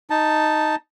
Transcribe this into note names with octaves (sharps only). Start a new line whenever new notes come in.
D#4 A5